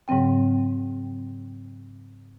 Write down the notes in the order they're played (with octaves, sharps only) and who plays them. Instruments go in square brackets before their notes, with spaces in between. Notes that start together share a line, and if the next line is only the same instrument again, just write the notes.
[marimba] G#2 C#3 F#3 C4 G5